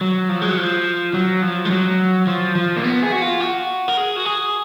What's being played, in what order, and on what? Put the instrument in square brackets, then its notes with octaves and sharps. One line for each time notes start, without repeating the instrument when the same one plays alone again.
[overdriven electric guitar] F#3
F3
G#3
F#3
F3
F#3
F3
G#3
F#3
F3
F3
A#3
B3
G#4
F#4
F4
F#4
A#4
G#4
F#4
G#4